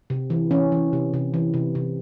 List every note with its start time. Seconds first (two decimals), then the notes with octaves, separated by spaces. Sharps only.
0.10 C3
0.30 E3
0.51 E3 C#4
0.72 E3
0.93 C3
1.14 C3
1.34 E3
1.54 C3
1.75 C3